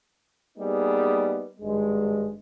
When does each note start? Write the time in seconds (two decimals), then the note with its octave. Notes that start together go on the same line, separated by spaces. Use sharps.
0.58 G3 A#3 B3 D#4 G#4
1.60 G#1 G2 G#3